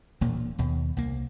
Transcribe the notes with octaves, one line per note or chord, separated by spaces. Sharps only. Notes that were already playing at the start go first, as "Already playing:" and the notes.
E1 D2 A#2 A#3
D#2 B2
C2 A#3